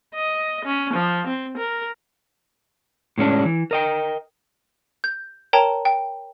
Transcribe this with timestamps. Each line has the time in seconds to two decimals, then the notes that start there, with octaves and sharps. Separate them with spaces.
0.15 D#5
0.65 C#4
0.93 F3
1.27 C4
1.57 A#4
3.18 A2 G#3 C#4 D4
3.45 E3
3.71 A#4 D#5 G5
5.04 G6
5.53 A#4 C#5 G5 A5 A#5
5.85 G5